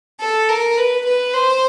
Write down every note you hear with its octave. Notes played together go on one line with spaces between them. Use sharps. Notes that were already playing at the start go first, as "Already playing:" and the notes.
A4
A#4
B4
B4
C5